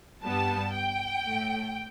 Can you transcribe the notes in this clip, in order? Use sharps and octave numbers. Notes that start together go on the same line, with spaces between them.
G2 G3 B3 A5
G5
A2 A3